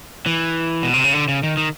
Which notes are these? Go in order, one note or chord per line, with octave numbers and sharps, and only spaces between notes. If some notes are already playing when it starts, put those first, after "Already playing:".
E3
B2
C3
C#3
D3
C#3
D#3
D#3